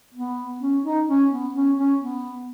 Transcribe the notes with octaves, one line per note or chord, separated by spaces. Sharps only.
B3
C#4
D#4
C#4
B3
C#4
C#4
B3